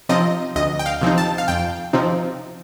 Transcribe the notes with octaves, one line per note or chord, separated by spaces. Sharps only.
C3 F3 C4 D#4 D#5
D2 D#5
G5
F5
C3 F3 C4 D#4
A5
F5
F2 G5
C3 F3 C4 D#4